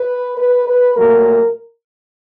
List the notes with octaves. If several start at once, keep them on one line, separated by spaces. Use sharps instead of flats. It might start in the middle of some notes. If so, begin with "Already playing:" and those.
Already playing: B4
B4
B4
A#2 F#3 A3 A#4